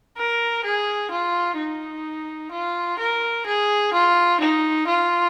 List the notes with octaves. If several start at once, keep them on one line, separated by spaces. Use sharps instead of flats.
A#4
G#4
F4
D#4
F4
A#4
G#4
F4
D#4
F4